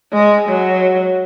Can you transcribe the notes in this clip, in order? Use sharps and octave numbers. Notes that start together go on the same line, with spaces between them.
G#3
F#3